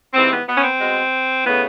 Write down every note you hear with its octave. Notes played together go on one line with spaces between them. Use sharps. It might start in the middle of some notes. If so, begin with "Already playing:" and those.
G#2 E3 G3 C4
B3
B3
C#4
C4
B2 G#3
C#3 E3 A3 B3